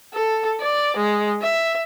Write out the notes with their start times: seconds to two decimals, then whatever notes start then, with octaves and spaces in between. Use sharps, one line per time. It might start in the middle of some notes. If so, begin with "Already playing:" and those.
0.14 A4
0.61 D5
0.97 G#3
1.42 E5